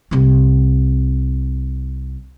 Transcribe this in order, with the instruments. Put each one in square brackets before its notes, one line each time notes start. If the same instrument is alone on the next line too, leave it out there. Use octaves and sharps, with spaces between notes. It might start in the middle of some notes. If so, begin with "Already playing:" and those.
[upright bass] C2 C4